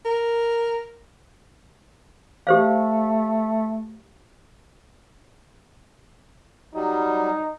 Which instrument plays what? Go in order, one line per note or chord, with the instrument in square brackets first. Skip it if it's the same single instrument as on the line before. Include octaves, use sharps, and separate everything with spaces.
[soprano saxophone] A#4
[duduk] A3 [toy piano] G4 C5 F5
[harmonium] F#3 G3 [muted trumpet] D#4